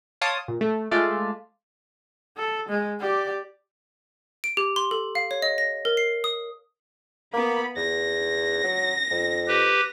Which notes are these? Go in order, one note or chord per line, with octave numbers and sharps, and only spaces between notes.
C#5 F5 A5 C6 D6 D#6
A#2
A3
G#3 A3 F4 D5 E5
A4
G#3
G4 D5
D7
G4
C6
A4
F5
C#5
D#5
A#6
A#4
C7
D#6
A#3 B3 B5
E2 A#6
F#3
F2
G4 B4